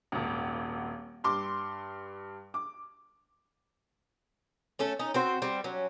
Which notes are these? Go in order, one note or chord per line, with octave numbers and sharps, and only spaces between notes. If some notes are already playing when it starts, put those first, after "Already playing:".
D#1 G#1
G2 C6 D6
D6
A3 C#4 A4
C#4 D#4
C4 F#4 C5
G3 C4
F#3 C#4